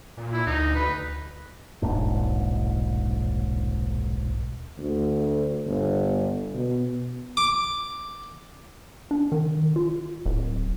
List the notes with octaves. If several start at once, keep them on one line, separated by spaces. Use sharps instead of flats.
A#2
E4
D2 D#4
B4
D#1 B1 G#2 D4
D2
G1
B2
D6
D4
D#3
F4
D1